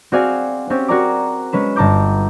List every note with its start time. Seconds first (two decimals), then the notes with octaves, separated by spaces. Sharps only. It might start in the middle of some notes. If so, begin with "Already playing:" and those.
0.12 C4 F#4 G#4 D5 F5 G#5
0.70 C4 C#4 G4
0.88 F#4 G#4 A#4 D5 A#5 D6
1.52 G#3 C#4 B4 E7
1.76 G1 A5 A#5 D6 G6